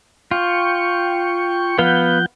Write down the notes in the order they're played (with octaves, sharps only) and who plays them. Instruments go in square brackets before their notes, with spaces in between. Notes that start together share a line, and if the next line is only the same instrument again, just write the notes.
[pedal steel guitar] F4 [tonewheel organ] G5 C#6
[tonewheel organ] F3 F#5 G6 [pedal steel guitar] B3 B4 F5